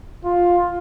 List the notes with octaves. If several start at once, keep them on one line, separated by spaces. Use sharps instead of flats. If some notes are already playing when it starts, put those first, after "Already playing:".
F4